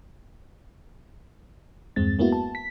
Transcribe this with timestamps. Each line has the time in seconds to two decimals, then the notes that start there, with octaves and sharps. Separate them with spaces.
1.96 E2 G2 G#3 C4 A6
2.19 G#3 A#3 B3 E4 F#4
2.32 A5
2.55 B6